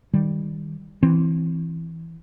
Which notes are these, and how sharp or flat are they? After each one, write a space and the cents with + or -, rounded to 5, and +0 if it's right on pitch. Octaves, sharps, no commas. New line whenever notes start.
D#3 +0 G3 +0
E3 +0 C4 +0